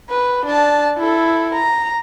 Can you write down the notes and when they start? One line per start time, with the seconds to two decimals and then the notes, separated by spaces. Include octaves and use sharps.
0.10 B4
0.46 D4 A5
0.98 E4 A4
1.55 A#5